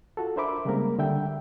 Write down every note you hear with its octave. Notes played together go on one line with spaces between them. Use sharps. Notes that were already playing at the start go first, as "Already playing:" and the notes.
F4 F#4 A4
D4 A#4 C5 E5 B5 D6
C#3 G3 G#3 A#3 C4 A#4
D3 G3 E5 G5